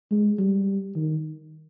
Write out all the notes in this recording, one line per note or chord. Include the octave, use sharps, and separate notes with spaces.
G#3
G3
D#3